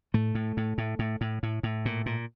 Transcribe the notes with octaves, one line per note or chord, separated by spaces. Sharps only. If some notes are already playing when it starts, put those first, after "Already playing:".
A2 A3
A2
A2
A2
A2
A2
A2
A2
A#2
A#2